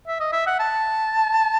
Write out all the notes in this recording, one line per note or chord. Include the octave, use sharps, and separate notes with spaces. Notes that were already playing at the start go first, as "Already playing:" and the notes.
E5
D#5
E5
F#5
A5